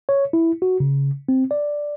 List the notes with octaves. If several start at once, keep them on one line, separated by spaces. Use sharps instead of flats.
C#5
E4
F#4
C#3
C4
D5